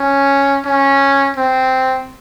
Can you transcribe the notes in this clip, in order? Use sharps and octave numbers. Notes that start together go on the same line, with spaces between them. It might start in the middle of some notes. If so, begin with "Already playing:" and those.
Already playing: C#4
C#4
C4